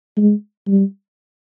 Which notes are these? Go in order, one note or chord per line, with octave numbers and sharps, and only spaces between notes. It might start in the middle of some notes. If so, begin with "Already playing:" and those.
G#3
G3